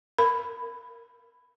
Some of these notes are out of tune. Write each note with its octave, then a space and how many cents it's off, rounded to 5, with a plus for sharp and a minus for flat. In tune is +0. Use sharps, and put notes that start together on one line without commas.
A#4 +0 B5 +15